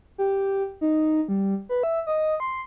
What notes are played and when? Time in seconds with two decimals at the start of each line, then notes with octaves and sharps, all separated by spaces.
0.18 G4
0.81 D#4
1.28 G3
1.69 B4
1.83 E5
2.07 D#5
2.40 C6